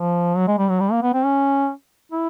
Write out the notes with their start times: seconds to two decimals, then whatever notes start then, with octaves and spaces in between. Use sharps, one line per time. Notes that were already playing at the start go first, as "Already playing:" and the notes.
Already playing: F3
0.37 F#3
0.48 G#3
0.58 G3
0.69 F#3
0.80 G3
0.92 A#3
1.03 B3
1.14 C4
1.25 C#4
2.12 E4